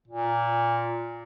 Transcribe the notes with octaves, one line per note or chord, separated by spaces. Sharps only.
A#2